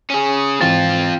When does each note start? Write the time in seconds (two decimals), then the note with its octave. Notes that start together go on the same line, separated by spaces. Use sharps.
0.10 C#4 G#4
0.61 G#2 E3 C4 F4 A6